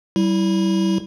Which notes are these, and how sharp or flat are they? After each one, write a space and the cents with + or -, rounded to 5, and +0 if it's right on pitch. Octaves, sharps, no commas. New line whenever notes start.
G3 -35 E4 -5